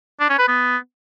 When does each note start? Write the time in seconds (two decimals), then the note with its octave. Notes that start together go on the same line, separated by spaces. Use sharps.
0.20 D4
0.29 C#4
0.39 B4
0.48 B3